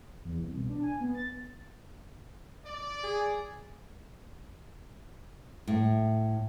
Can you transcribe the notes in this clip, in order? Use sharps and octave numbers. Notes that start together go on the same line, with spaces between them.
E2
C2
B2
D4
G#5
B3
A6
D5
G#4
A2